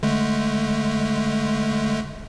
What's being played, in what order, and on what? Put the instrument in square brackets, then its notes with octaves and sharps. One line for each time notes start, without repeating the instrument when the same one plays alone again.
[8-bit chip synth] D3 G#3 A3